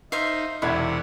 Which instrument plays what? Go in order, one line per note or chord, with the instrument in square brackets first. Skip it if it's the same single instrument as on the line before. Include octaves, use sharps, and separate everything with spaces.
[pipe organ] D#4 [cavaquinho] C5 E5 F5
[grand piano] E1 E5 G#6 [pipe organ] C3 F#5 [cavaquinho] E4